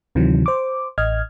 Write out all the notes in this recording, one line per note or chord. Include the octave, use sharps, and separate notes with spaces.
D2 C3 D#3 E3 F#3
C5 D6
A1 D#5 F6 G#6